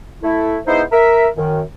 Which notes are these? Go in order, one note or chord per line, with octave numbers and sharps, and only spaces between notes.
A3 E4
G#3 B3 D#4 E4 C5
A#4 E5
F#2 D#3